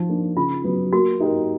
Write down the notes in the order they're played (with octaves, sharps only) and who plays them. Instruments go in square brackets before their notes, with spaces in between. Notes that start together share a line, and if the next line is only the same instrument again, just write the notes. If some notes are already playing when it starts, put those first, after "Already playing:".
Already playing: [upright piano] F3 [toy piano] D#4
[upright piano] A#3 D4
[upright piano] C#3 [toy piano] F4
[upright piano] F#3 B3
[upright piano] A#3 [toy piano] F#4
[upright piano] D#4 G4 A#4